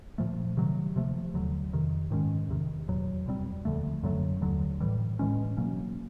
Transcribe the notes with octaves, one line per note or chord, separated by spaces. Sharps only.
A#2 F3 A3
C3 D#3 F#3
C3 F3 A3
D#2 D3 F#3
F2 C3 D#3
G#2 D#3 G#3 C#4
E2 C3 D#3
E2 B2 F#3
E2 B2 G3 C4
D2 D3 F3 A3
F#2 D3 F#3 A3
D#2 D3 F#3
A2 E3 G3
A2 E3 G#3 C#4
B2 F#3 A#3 C#4